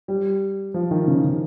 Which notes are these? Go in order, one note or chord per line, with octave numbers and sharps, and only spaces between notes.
G3
F3
D#3
C#3
C#3